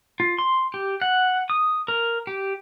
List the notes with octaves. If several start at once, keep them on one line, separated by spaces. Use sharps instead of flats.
F4
C6
G4
F#5
D#6
A#4
G4